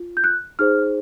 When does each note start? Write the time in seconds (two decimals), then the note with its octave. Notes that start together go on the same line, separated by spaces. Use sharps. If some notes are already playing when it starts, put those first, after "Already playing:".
Already playing: F4
0.17 G6
0.24 F#6
0.59 D#4 G#4 C5 F6